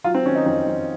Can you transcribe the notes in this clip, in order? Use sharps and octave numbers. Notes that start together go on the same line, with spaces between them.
F#3 F4
C4
D#3 C#4
D#4
F2 C4
F2